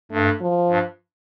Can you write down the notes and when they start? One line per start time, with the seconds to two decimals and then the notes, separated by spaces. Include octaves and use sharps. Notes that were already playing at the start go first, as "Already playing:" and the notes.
0.11 G2 A3
0.41 F3
0.70 G2